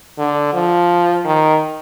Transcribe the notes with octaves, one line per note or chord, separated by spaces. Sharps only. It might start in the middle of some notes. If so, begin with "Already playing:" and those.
D3
F3
D#3